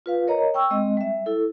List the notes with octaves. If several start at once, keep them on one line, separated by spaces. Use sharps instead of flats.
F4 B4 F5
A#4 C#5 D#5 A#5
G5 C#6 E6
G#3 C4 D#5
G3 E5
E4 A4